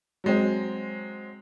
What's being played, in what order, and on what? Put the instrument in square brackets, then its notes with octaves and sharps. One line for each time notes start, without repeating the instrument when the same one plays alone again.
[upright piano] F#3 G#3 C4